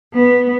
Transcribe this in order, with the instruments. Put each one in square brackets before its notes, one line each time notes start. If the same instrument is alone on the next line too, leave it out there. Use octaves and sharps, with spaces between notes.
[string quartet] B3